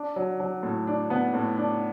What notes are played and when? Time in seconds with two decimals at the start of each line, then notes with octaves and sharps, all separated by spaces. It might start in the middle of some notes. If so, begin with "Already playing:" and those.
Already playing: D4
0.16 F#3
0.40 F#3
0.63 A2
0.87 D4
1.10 B3
1.34 A2
1.58 D4